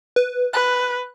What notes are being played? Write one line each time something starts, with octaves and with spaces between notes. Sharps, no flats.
B4
B4 F#6